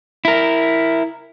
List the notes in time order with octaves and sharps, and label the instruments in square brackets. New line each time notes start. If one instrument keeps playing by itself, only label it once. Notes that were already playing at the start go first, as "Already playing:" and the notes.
[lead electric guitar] E4 A#4